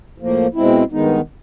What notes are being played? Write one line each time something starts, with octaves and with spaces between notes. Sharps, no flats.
A2 F3 A#3
B2 G#3 C4 E4
G2 D#3 G#3 B3 D#4